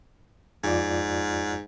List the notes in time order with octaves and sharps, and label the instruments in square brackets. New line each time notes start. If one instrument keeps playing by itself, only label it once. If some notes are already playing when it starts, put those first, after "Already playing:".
[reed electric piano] F2 F4 D5 [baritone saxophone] G#2